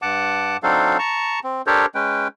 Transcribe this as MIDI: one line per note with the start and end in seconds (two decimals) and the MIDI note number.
0.02 0.57 43
0.02 0.57 78
0.02 0.57 81
0.02 0.57 86
0.63 0.97 54
0.63 0.97 60
0.63 0.97 62
0.63 0.97 63
0.63 0.97 69
0.63 0.97 77
0.99 1.40 81
0.99 1.40 82
0.99 1.40 85
1.44 1.62 60
1.67 1.86 62
1.67 1.86 67
1.67 1.86 69
1.67 1.86 70
1.67 1.86 72
1.67 1.86 73
1.95 2.28 56
1.95 2.28 61
1.95 2.28 71
1.95 2.28 79